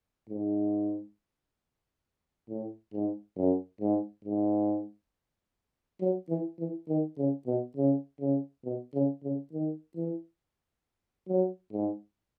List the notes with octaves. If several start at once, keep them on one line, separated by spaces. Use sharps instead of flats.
G#2
A2
G#2
F#2
G#2
G#2
F#3
E3
E3
D#3
C#3
B2
C#3
C#3
B2
C#3
C#3
D#3
E3
F#3
G#2